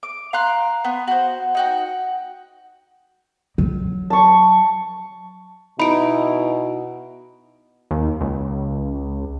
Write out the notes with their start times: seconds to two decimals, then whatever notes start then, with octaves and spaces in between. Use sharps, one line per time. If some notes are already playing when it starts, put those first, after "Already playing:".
0.03 D6
0.33 F5 A#5 C6 F#6
0.84 B3
1.07 F#4 C5
1.55 D#4 F#4 G5
3.58 F#3
4.10 A5 C#6
5.79 B2 D#4 E4 B5 D7
7.91 D#2
8.20 C#2